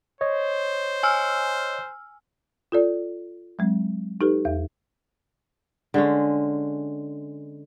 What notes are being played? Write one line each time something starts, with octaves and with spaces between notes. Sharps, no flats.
C5 C#5 D#5
G#5 E6 F6
F4 A4 D5
F#3 G#3 C4
D#4 G4 A4 B4
E2 E5
D3 G#3 C#4